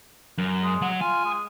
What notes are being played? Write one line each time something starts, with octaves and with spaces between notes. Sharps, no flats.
F#2
G#3
F#3 F#5
F4 G#5
G#3